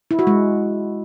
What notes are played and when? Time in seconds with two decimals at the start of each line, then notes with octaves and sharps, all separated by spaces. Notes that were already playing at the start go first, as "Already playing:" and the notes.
0.11 E4
0.19 F#4
0.27 G#3